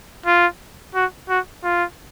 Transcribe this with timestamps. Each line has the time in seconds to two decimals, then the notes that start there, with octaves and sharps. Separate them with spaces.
0.26 F4
0.95 F#4
1.29 F#4
1.64 F4